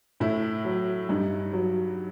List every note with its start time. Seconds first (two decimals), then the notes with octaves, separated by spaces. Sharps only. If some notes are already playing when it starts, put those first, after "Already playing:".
0.20 A2 E4
0.65 F#3
1.09 G2 D#4
1.53 F#3